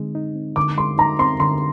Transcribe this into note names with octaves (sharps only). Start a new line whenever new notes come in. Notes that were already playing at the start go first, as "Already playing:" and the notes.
Already playing: D3 G#3 C4 D#4
D#4
C4
D3 D6
G#3 C6
D#4 A#5
C4 C6
D3 C6